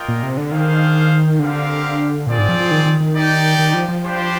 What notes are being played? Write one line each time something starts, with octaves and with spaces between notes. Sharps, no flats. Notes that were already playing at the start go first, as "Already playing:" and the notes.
Already playing: A#3 F4 A#4 D#5 G5
A#2
C3
D3
D#3 D4 G#4 C5 F5
D3 C4 G4 A#4 F5
A#2 C4 F4 G#4 D5
G#2
F3
F3
D#3
D#3
D#3
D#4 G4 D5 G5
D#3
F3
F3
G3 D4 G4 C5